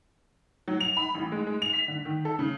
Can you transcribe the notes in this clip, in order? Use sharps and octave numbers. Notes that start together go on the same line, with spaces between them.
F#3
F7
B5
A1
G#3
G#3
F7
B6
D3
D#3
A4
C#3